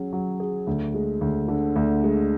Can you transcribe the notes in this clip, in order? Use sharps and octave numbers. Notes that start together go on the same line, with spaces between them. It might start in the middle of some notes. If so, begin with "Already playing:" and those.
Already playing: F#3 C#4 G#4
F#3
G#4
D2
G#3
D2
D3
D2
G#3